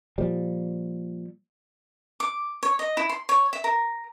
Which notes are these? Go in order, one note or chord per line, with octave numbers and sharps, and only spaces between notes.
A#2 F3 G3
D6
C#5
D#5
E4
C6
C#5
E5
A#4